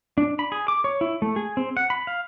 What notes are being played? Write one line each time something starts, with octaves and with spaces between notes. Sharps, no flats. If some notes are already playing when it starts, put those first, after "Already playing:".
D4
B5
G#4
D6
C#5
E4
A3
G#4
C4
F#5
B5
F5